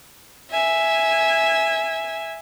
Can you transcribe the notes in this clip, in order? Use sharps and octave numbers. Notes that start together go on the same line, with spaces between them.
E5 G#5